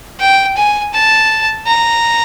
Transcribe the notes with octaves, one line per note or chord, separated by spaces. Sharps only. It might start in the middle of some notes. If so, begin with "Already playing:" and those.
G5
G#5
A5
A#5